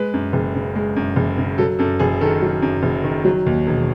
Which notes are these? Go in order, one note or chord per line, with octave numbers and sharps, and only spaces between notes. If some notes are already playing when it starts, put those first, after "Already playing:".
Already playing: G#3 B4
F#2
F#1
C#3
G#3
F#2
F#1
C#3
F#3 A4
F#2 A4
F#1 G#4
D#3 A4
F#3
F#2
F#1
D#3
F#3
D#2
E1